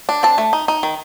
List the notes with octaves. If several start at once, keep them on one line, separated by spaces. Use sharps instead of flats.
D4
C4 A5
A3
D#4
D#4
D#3